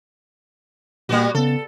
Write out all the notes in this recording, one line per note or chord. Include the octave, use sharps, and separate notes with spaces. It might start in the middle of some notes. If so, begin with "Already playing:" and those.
A#2 G3 A#3 B3 F#4
C#3 B3 A4